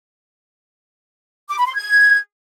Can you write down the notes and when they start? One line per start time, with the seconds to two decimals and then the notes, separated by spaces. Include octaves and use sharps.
1.50 D6
1.58 B5
1.67 C6
1.75 G#6